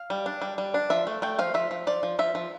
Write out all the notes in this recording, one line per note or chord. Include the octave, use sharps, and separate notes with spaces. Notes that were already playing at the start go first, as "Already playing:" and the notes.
Already playing: F5
G3
D4
G3
G3
D4
F3 E5
A3
A3 G5
F3 F5
F3 E5
F3
F3 D5
F3
F3 E5
F3